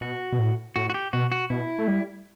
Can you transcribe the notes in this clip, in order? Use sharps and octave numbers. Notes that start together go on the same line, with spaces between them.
B2 F#4
B2
A2
A2 F#4
F#4
G4
B2 F#4
F#4
B2 E4
A3
G3